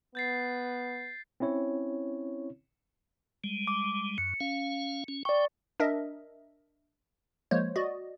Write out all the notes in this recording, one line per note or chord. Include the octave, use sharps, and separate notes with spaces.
B3 G6 A6 C7
C4 C#4 E4 C#5
G3 G#3
D6
F#2 C#7
C#4 F5
C#4
D5 G5 C#6
D4 A#4 D#5 E5
F3 G#3 A#3 C5 C#5
F#4 D5 D#5